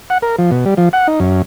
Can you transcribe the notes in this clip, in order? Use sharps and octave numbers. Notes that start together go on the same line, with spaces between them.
F#5
A#4
F3
B2
G3
F3
F#5
D#4
F#2